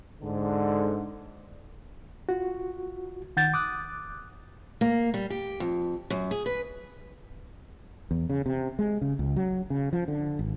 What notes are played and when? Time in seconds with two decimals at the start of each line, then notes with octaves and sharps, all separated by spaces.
0.21 G#2 D3
2.29 F4 F#4
3.37 D#3 F#5 G6 A6
3.54 D6 D#6 F#6
4.81 A#3
5.14 G3
5.30 G4
5.60 F2
6.10 F#2
6.31 G#4
6.46 B4
8.11 E2
8.30 C#3
8.46 C3
8.79 G#3
9.01 C#3
9.19 C#2
9.36 F#3
9.70 C#3
9.93 F3
10.08 D3
10.39 G#1